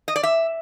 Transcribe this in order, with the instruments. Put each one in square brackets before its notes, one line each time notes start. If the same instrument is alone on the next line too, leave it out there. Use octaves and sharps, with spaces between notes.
[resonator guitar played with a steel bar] D#5
D5
E5